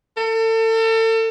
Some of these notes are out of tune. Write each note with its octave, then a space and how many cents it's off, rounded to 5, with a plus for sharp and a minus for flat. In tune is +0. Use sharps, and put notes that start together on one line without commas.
A4 +35